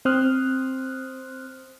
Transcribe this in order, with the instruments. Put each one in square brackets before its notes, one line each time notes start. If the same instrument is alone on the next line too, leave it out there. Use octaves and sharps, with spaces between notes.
[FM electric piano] C4 C5 C6 D#6 F6 F#6